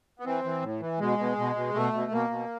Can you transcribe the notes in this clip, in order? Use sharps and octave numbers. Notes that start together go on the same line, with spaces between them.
B3
E3 C4
E3
A2
E3
B2 G#3
B2
B2
B2
B2 A3
B2
B2 A#3
B2